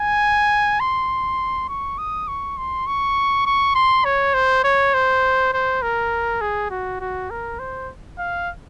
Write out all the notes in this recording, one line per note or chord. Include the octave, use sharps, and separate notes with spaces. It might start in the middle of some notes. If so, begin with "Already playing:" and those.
Already playing: G#5
C6
C#6
D#6
C#6
C6
C#6
C#6
C6
C#5
C5
C#5
C5
C5
A#4
G#4
F#4
F#4
A#4
C5
F5